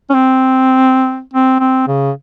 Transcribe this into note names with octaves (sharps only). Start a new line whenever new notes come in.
C#4
C4
C4
C4
C#3